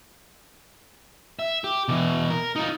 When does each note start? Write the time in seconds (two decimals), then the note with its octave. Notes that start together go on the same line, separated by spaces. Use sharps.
1.39 E5
1.64 G4
1.88 B2 E3
2.30 A#4
2.56 D#4 F4